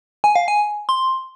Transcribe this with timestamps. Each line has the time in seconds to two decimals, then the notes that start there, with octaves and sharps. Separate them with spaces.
0.24 G#5
0.36 F5
0.48 G#5
0.89 C6